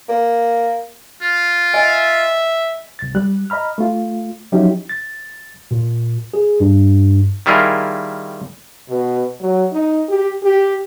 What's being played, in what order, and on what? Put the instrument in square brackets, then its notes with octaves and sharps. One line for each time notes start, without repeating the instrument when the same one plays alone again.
[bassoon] A#3
[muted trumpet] F4
[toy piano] D#5 G#5 [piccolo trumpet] E5
[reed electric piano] C2 A6
G3 F#6
D#5 A#5 B5 F6
A3 F4
F3 F#3 C#4 D#4 E4 G4
[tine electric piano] A6
A#2
G#4
G2
[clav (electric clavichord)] D#3 G3 E4 F4 G#4 A#4
[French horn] B2
F#3
D#4
G4
G4